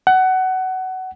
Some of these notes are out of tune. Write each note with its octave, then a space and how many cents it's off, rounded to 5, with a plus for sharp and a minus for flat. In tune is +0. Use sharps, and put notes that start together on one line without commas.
F#5 +20